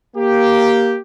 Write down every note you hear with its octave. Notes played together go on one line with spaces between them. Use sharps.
A#3 G4